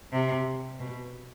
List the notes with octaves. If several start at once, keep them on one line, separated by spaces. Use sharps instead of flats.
C3
B2